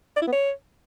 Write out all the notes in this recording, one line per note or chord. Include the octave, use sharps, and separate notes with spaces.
D5
E4
B3
C#5